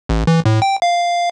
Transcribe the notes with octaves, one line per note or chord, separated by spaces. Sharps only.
A1
E3
A2
G5
F5